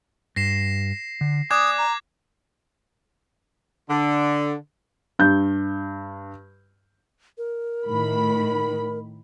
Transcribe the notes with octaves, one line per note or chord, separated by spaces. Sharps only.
G2 A#6 C7 E7
D3
D5 G#5 D6 D#6 F#6 G#6
A#5
D3
G2 G6
A#4
A2 D#3 B5